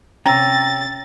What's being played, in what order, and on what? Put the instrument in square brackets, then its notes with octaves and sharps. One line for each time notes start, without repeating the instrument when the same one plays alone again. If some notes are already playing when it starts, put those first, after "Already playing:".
[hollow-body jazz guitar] C3 C#4 [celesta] G5 E6 [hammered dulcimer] A#5 [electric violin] A6